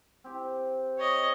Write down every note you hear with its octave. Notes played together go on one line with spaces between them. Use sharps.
C4 G4
C#5 D#5